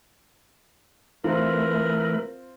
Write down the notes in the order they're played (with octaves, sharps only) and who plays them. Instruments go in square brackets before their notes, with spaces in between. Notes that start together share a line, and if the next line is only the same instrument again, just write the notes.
[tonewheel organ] E3 A3 B4 [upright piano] C4 F4 [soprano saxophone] A#4